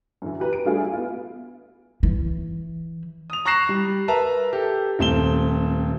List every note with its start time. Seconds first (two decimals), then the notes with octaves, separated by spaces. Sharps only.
0.22 F#2 D3 E3
0.40 G4 B4 A#5
0.53 D7
0.65 G3 A3 D4 F4 G4 G#4
0.80 E4
0.93 B3 F4
2.03 E3
3.30 D#6 F7
3.45 A#5 C#6 F#6 A#6 C7 E7
3.69 G3
4.08 A#4 B4 E5 A5 A#5
4.53 G4 A4
4.99 D#1 A3 C4 E7 G7